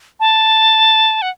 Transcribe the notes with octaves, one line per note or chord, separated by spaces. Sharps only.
A5
F#5